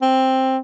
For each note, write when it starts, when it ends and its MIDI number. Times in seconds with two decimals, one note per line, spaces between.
0.02 0.58 60